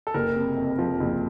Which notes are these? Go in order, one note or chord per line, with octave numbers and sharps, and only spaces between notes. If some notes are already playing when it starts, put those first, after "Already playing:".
A4
F#1 A#4
C3
F2
F3
F#1